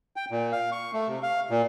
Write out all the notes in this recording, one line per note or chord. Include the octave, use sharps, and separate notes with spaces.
G5
A#2
F5
C#6
A3
C3
F5
A#2